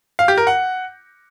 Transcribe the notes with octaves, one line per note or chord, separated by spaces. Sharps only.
F5
G4
A#4
F#5